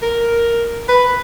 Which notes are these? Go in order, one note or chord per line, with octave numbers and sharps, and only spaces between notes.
A#4
B4